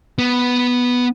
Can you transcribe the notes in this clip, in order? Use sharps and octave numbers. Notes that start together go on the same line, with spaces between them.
B3